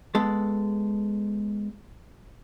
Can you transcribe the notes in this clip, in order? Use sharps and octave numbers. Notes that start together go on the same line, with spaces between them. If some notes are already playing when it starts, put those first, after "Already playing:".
G#3 B3 A4